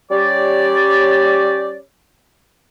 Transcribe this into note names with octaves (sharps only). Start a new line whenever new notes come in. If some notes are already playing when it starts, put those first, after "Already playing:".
G3 C#4 G4 C#5 D5